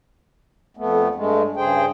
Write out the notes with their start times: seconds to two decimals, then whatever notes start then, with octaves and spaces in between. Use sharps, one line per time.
0.77 F2 A3 B3
1.15 G2 G#3 A3
1.57 G2 C#3 G#4 C5 G5